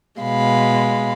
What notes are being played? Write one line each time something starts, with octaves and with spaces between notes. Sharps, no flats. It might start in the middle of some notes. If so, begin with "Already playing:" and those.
B2 G#3 F5 B5